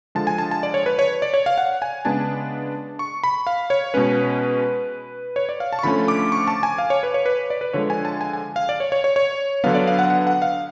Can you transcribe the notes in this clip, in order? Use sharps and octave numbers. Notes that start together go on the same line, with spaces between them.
D3 F3 G#3 A5
G#5
A5
A5
D5
C#5
B4
C#5
D5
C#5
F5
F#5
G#5
C#3 G#3 B3 D4 A5
C#6
B5
F5
C#5
B2 G#3 C#4 B4
C#5
D5
F5
A5
C#6
D3 F3 A3 C#4 B5
D6
C#6
A5
G#5
F5
C#5
B4
C#5
B4
D5
B4
D3 F3 G#3 C#5
G#5
A5
G#5
G#5
F5
D5
C#5
C#5
C#5
C#5
D3 F#3 B3 D4 F5
D5
F5
F#5
F#5
F#5
F5